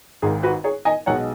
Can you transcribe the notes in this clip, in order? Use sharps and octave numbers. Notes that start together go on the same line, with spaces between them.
G#1 G#2 D#3 G#4
F#4 B4
G#4 C#5
D#5 G#5
B1 B2 G#3 C#5 F#5